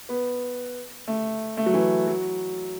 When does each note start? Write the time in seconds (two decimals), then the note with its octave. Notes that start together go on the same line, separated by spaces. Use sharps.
0.09 B3
1.08 A3
1.57 A3
1.66 F#3
1.74 E3
2.08 F#3